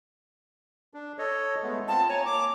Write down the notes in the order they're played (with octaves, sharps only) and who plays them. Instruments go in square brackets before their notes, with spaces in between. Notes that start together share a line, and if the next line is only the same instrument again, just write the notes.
[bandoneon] D4
A4 C#5 D#5
G#3 A3 B3
[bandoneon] C4 F4 [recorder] A5
[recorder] C#5 [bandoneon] G#5 A#5
[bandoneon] A#3 [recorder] D6